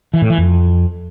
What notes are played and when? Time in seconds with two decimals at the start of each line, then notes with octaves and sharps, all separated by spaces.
0.14 E3
0.22 A2
0.30 E3
0.38 F2